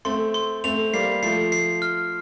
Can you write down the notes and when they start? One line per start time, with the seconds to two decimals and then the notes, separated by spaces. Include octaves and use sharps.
0.05 A3 C4 C6
0.34 C6
0.64 A3 C4 F7
0.93 G3 A#3 C7
1.23 F3 A3 C7
1.52 C7
1.82 F6